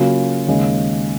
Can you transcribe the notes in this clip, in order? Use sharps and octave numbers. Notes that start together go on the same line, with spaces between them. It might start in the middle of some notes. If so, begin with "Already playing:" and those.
Already playing: C#3 F#3 A#3 F4
D#2 C#3 G#3